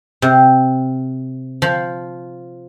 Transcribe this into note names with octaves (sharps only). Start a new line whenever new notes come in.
C3
F3